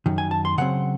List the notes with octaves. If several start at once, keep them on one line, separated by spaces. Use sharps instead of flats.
F#2 D#3
G#5
A5
C6
C#3 F#3 C4 F#5